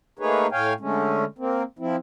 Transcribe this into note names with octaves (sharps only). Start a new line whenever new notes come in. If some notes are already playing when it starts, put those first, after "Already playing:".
A3 A#3 D#4 G#4 B4 C#5
A2 C#5 F5 G5 G#5
D3 G#3 A3 C#4
A#3 C4
F3 C4 E4